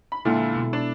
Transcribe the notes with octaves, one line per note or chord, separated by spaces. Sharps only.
B5
A#2 D3 G#3 E4 F4 A4
B2
D4